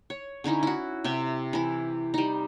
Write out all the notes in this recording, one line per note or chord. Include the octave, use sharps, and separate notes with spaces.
C#5
D3 C#4 D#4 E4
E4 F#4
C3 G4 E5
E3 E4
G3 D#4